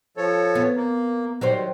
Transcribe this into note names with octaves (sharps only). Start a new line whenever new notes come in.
F3 A4 C#5
B3
A#3
D#3 F#3 G3 C5